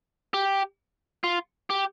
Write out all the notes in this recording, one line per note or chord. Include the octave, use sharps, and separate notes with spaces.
G4
F4
G4